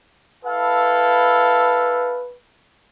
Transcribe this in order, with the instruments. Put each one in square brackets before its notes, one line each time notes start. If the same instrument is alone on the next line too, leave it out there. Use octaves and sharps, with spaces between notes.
[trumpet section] E4 A4 F5 [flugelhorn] B4